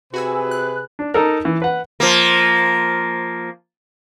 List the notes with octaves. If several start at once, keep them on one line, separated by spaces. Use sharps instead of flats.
C3 F#4 G#4 B4 G#5 E6
F#6
D4
D#4 A4 A#4
E3
B4 F#5
F3 A#3